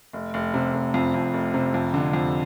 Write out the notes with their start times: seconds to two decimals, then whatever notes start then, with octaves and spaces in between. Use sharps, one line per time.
0.13 F1
0.34 F1
0.54 C3
0.74 F1
0.94 F2
1.14 F2
1.34 F1
1.54 C3
1.74 F2
1.94 D3
2.13 F2